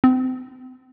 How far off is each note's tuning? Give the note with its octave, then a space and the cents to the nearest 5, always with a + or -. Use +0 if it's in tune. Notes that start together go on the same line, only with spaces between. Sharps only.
C4 -35